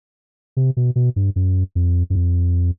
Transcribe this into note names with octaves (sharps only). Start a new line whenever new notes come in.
C3
B2
B2
G2
F#2
F2
F#2
F2